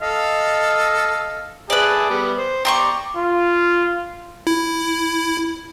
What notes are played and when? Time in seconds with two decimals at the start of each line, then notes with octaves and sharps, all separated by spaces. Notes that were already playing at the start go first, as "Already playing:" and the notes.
0.01 A4 D#5 F5
1.70 G#4 B4 D5 E5 A5
2.10 G3 B3
2.38 C5
2.65 G4 D5 A#5 C6 C#6
3.16 F4
4.47 E4